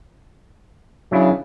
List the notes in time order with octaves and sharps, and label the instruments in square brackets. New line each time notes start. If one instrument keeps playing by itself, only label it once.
[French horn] C#3 [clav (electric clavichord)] F#3 D4 E4